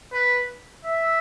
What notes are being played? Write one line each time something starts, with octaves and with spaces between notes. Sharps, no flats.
B4
E5